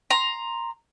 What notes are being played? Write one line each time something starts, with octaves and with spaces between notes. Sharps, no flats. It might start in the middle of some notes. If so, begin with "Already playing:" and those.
A#5 C6